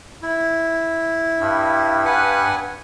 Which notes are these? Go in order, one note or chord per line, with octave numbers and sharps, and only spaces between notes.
E4
G2
B4 F#5 G#5